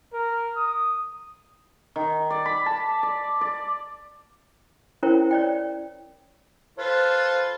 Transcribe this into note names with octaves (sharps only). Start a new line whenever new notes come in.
A#4
D#6
D#3
D5
B5
A5
D5
D5
C#4 E4 A#4 C5 C#5 G5
C#5 D5 G5
F4 A4 B4 C5